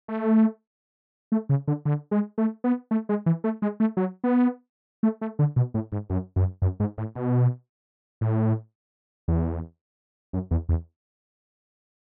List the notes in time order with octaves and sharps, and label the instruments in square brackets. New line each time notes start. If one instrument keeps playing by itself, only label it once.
[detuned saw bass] A3
A3
C#3
D3
D3
G#3
A3
B3
A3
G#3
E3
A3
G#3
A3
F#3
B3
A3
A3
D3
B2
A2
G#2
F#2
F#2
F#2
G#2
A2
B2
A2
E2
F#2
E2
E2